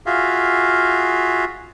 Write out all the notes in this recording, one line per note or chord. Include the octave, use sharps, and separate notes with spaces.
F4 F#4 G#4 E5 F5